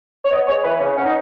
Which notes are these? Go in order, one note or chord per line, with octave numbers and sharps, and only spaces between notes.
C#5
B3 D#5
G#3 C#5
E3 B4
C#3 C#4
B3 C#4
D#4